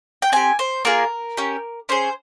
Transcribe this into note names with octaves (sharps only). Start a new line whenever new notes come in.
G5
C4 G4 G#5
C5
A#3 F4 G#4 A#4
C#4 G4
C#4 G#4 C5